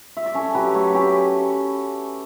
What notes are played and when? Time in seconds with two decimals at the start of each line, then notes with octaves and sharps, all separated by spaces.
0.17 E5
0.26 D5
0.34 C#4 A4 C#5
0.55 F#3 G4 B4
0.74 A3 A4 C#5
0.94 C#4 G4 B4